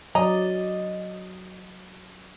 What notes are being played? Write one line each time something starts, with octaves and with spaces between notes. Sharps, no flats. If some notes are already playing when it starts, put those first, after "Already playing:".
F#3 D5 D#5 A#5